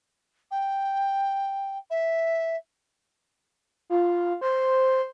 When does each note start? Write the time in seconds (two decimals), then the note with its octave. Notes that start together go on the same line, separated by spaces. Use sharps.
0.51 G5
1.90 E5
3.90 F4
4.41 C5